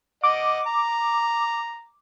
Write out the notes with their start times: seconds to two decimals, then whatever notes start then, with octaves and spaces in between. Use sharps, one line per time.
0.24 D#5 F#5 D6
0.66 A#5